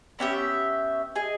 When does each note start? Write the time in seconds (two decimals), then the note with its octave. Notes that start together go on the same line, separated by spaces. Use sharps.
0.19 B3 C#4 G4 E5
1.16 G#4 D#5